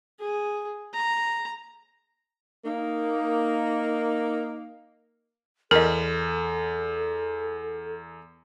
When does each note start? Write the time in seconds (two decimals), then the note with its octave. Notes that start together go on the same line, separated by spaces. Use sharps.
0.20 G#4
0.94 A#5
2.65 A#3 D#4
5.71 E2 A4 A#4 D#5